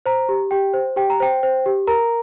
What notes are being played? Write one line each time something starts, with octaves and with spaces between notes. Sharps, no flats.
C5 A#5
G4
G4 G5
C5
G4 G5
A#5
C5 G5
C5
G4
A#4 A#5